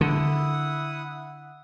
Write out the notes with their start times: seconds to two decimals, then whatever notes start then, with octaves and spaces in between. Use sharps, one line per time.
0.01 D3 E4 F#5 D#6